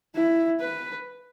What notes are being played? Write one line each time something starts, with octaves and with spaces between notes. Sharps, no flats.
E4
B4